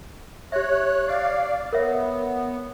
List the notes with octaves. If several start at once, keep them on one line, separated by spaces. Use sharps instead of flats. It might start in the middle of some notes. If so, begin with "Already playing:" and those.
G4 C#5 E5 F#6
D5 F5
B3 A#4 C#5 E5